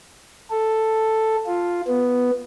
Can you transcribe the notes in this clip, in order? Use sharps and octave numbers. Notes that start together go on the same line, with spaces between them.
A4
F4
B3